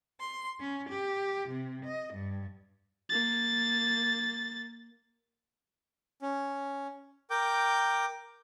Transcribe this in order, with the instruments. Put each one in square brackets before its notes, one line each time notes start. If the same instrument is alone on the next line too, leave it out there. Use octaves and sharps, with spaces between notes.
[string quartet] C6
C#4
G4
C3
D#5
G2
[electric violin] A#3 A6
[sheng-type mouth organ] C#4
A#4 G5 D6 G6